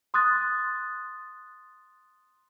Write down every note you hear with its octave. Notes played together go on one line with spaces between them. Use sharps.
C6 D#6 F#6 A6